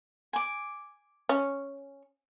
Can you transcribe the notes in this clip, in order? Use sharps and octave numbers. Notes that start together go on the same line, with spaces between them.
G#5 D6
C#4